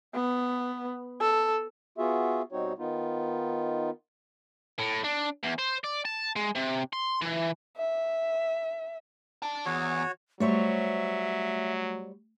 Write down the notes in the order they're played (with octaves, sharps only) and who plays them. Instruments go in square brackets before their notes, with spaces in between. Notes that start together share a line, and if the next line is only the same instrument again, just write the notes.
[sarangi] B3
A4
[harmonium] B3 F4 F#4 G#4 E5
B2 G3 C4 D#4 F#4 C#5
D#3 B3 D#4 F4
[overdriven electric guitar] A2
D4
E2
C5
D5
A5
G#3
C3
C6
E3
[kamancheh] E5
[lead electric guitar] D5 A5
[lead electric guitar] E2 [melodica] F#4 C#5
[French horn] F#3 [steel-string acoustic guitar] G3 C5 C#5 [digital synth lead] A3 [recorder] E5